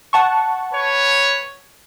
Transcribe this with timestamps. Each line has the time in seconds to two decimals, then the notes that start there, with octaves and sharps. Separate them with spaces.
0.13 F#5 A5 C#6
0.73 B4 C#5